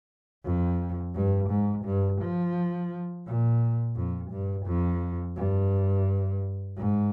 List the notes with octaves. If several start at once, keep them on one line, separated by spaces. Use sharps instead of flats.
F2
G2
G#2
G2
F3
A#2
F2
G2
F2
G2
G#2